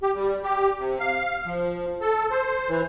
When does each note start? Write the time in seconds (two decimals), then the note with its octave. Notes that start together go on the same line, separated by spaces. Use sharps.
0.02 G4
0.15 G3
0.44 G4
0.79 C3
0.99 F5
1.46 F3
2.01 A4
2.31 C5
2.69 E3